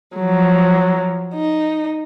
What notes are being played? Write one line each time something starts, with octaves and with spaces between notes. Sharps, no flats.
F3 F#3
D#4